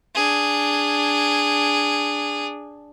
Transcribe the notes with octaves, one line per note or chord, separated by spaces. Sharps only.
D4 G#4